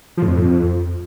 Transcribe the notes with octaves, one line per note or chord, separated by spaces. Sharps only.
F3
A2
F2